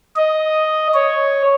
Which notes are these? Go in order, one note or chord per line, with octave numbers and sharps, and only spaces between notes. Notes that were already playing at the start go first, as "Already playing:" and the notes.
D#5
C#5